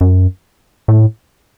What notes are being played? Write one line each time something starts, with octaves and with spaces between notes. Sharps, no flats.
F#2
A2